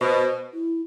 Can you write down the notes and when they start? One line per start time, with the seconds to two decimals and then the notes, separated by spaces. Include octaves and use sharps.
0.01 B2 C5
0.53 E4